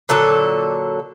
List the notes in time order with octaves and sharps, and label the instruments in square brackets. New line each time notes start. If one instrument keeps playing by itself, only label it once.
[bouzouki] A#2 D3 F#3 A4